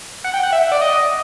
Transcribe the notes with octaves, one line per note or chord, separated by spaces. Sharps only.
F#5
G5
F#5
E5
D5
D#5